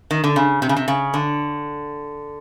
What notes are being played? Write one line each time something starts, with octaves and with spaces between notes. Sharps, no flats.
D#3
D3
C#3
C3
C#3
C3
C#3
D3